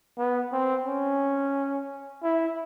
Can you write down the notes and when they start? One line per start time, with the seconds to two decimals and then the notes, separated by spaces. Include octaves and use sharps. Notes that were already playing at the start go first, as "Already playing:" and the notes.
0.18 B3
0.52 C4
0.86 C#4
2.23 E4